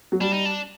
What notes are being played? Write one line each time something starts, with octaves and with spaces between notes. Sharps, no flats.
F#3
G3 D4
D#4
D4